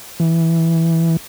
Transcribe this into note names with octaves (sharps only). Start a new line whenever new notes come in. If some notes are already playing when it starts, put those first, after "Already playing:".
E3